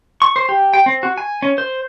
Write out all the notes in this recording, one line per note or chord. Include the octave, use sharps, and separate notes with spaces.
C#6
C5
G4
G5
C4
F#4
G#5
C#4
C5